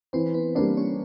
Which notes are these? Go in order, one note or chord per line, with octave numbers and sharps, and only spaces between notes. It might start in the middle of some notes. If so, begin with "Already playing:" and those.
E3 C4 C5
B3 B4
G3 A#3 C4 D4 C5
C#4 C#5